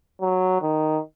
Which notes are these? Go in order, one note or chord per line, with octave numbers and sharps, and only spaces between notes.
F#3
D#3